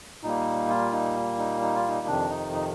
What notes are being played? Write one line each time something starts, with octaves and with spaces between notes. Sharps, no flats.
A#2 G3 A#3 D#4
F4
D#4
D#4
D#4
F4
D#4
F2 C3 D#3 D4
D#4
D#4